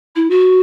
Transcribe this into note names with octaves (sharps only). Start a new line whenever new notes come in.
E4
F#4